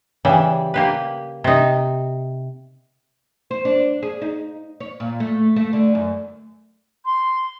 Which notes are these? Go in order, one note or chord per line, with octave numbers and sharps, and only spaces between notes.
C#3 E3 G3
A#3 G4 B4
C3 D#4
C5
D4
G#4
D#4
C#5
A#2
A3
A3
D3
F#2
C6